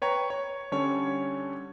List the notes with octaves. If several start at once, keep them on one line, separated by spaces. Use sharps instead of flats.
B4 C#5 G5 A#5 C#6
C#5
D3 G3 C#4 A4 C#5